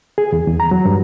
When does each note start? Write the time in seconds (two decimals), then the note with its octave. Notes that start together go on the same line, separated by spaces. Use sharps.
0.18 G#4
0.32 E2
0.47 E2
0.60 A#5
0.71 F#3
0.85 G2